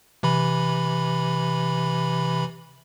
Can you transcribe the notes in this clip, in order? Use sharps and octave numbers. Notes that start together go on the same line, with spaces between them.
C3 E3 B5